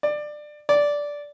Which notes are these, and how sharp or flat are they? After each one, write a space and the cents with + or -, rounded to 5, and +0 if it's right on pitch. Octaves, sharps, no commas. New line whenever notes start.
D5 +20
D5 -10